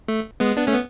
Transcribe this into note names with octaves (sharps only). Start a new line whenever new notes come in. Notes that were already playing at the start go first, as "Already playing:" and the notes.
A3
G#3 B3
B3 D4
A3 C#4
B3